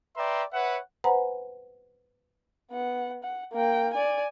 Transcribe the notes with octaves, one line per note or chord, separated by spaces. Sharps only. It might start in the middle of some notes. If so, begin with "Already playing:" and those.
B4 D5 E5 G5 A#5 C6
B4 C#5 E5 F#5
B4 C5 F#5 G#5 A#5 B5
B3 F#5
F#5
A#3 G5
D5 G#5